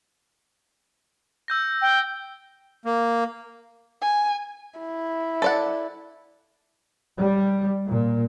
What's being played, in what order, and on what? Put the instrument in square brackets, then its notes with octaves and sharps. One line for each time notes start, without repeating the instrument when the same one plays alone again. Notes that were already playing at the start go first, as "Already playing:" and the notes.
[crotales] E6 G6 A#6
[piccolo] G5
[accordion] A#3
[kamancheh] G#5
[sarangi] E4
[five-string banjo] A4 D5 F#5
[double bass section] G3
A#2